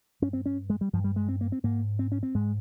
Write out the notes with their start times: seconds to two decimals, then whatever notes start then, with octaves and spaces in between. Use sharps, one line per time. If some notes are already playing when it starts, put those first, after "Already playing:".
0.22 G2 C#4
0.33 C4
0.46 C#4
0.70 G#3
0.81 G3
0.93 G2 F3
1.04 G3
1.16 G#3
1.28 C4
1.41 A#3
1.52 C4
1.63 G#2 A#3
1.99 C4
2.12 C#4
2.23 C4
2.35 G#2 G#3